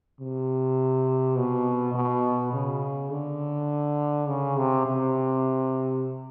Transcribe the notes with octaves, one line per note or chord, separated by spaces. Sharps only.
C3
B2
B2
C#3
D3
C#3
C3
C3